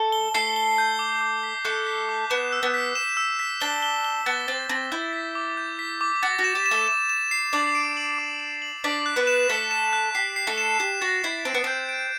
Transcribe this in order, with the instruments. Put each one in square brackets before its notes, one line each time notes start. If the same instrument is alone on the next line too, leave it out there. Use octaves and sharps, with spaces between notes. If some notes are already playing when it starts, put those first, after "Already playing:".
Already playing: [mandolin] A3 A4
[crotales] G7
[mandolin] A3 A4 [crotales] C7
[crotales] G7
G6
D6
D6
B6
[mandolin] A3 A4 [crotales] F#6
[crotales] B6
D6
[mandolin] B3 [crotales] E7
[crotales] E6
[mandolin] B3
[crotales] B6
E7
E6
B6
[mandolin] D4 [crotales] G7
[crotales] G7
G7
[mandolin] B3 [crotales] A6
[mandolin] C4 [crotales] A6
[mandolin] C4 [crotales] A6
[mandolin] E4 [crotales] G6
[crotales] B6
D6
G6
B6
D6
[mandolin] F#4 [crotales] A6
[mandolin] F#4
[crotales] E7
[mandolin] G4
[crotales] E7
[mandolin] A3 A4
[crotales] E7
E7
C7
[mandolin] D4 D5 [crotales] D6
[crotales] D7
F#7
D6
D7
F#7
[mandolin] D4 D5 [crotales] B6
[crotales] F#6
[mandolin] B3 B4
[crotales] E7
[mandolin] A3 A4 [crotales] B6
[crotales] E7
F#6
[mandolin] G4 [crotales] C7
[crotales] C7
[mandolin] A3 A4
[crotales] E7
[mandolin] G4 [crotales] E7
[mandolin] F#4 [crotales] A6
[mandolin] E4 [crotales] C7
[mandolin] C4 [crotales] D7
[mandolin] B3
[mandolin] C4 [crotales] G6
[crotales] D7